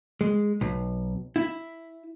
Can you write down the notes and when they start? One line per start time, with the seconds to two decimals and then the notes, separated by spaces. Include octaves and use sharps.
0.21 G#3
0.61 B1
1.36 E4